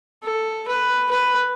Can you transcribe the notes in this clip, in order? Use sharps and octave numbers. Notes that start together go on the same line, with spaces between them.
A4
B4
B4